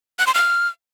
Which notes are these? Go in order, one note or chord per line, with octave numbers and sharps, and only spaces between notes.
F#6
C6
F6